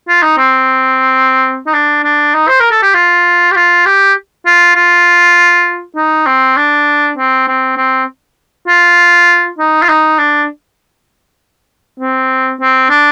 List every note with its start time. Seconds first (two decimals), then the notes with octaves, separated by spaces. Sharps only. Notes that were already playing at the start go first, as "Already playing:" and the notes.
0.09 F4
0.23 D#4
0.38 C4
1.67 D#4
1.74 D4
2.04 D4
2.34 D#4
2.48 C5
2.60 A#4
2.71 A4
2.82 G4
2.94 F4
3.51 G4
3.56 F4
3.86 G4
4.46 F4
4.75 F4
5.96 D#4
6.26 C4
6.57 D4
7.18 C4
7.48 C4
7.77 C4
8.68 F4
9.58 D#4
9.83 F4
9.89 D#4
10.19 D4
12.00 C4
12.61 C4
12.90 D4